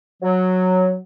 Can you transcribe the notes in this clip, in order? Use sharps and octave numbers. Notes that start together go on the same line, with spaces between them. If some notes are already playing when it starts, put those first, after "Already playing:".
F#3